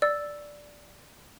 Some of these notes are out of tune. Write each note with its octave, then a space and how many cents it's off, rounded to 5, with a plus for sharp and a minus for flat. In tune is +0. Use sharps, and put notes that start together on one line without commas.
D5 +0 E6 +0